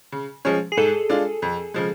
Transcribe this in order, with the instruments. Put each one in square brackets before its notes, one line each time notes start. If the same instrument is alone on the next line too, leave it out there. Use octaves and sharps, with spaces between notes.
[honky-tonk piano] C#3
F3 G#3 C#4
[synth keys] G#4
[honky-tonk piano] G#2 [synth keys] A4
[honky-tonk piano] G#3 D4 F4
F2
C#3 F3 G#3